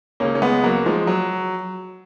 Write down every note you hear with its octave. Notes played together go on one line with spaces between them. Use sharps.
C#2 C#3 A#3 C#4
C#4
G#3 B3
F#3 A#3
F3 G#3
F#3